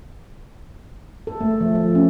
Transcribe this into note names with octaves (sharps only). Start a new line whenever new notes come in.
A4
A3
F3
F3
C#4